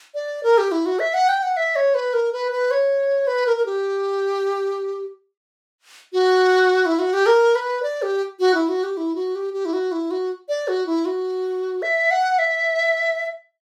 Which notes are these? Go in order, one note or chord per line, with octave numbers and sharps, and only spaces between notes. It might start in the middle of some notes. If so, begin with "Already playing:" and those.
D5
A#4
G4
E4
F#4
E5
F#5
G5
F#5
E5
C#5
B4
A#4
B4
B4
C#5
B4
A#4
A#4
G4
F#4
E4
F#4
G4
A#4
B4
D5
G4
F#4
E4
F#4
G4
E4
F#4
G4
G4
E4
F#4
E4
F#4
D5
F#4
E4
F#4
E5
F#5
E5